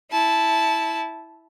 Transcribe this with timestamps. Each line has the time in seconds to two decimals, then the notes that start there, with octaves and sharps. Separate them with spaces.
0.11 E4 A5